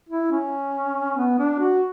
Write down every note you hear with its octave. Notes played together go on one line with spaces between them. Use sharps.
E4
C#4
B3
D4
F#4